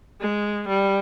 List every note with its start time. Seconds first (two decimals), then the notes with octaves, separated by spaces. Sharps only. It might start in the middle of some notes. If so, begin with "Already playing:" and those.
0.20 G#3
0.68 G3